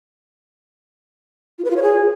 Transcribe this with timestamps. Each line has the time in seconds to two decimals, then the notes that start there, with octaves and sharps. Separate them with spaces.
1.59 F4
1.65 B4
1.70 F4
1.76 C#5
1.82 G#4